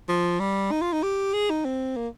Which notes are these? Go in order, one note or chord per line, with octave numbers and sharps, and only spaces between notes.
F3
G3
D#4
F4
D#4
G4
G#4
D#4
C4
A#3